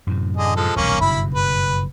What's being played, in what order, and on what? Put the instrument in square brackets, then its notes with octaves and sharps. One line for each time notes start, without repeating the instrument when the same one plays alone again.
[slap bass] F#2 A2 C3
[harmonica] D3 G#4 D#5
F3 G#3 A4
[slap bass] D#1 B1 [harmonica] A#3 C#4
[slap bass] F#1 G2 B2 [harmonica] E4 B5
[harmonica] B4